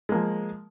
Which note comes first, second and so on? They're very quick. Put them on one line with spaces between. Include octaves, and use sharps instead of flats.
G#3 A#3 F3